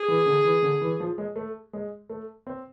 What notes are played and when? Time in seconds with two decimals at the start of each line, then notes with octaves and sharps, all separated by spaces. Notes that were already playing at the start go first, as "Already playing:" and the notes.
Already playing: G#4
0.08 E3
0.26 D3
0.44 E3
0.63 D3
0.81 E3
1.00 F3
1.18 G#3
1.36 A3
1.73 G#3
2.10 A3
2.47 C4